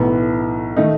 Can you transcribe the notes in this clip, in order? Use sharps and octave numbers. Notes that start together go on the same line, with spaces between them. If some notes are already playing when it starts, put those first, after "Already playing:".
Already playing: B1 A2 E3 B3
D#3 A3 D#4